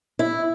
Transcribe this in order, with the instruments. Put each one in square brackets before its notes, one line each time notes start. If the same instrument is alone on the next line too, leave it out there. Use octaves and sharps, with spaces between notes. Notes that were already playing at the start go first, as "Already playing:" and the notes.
[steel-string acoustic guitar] E4